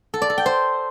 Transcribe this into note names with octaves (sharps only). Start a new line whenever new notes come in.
A4
D5
A4
G5
C5